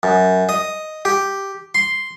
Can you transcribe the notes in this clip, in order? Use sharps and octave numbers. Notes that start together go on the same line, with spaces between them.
F#2
D#5
G4
C6